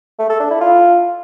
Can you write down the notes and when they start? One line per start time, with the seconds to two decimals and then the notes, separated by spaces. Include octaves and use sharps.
0.19 A3
0.29 A4
0.40 D4
0.50 E4
0.61 F4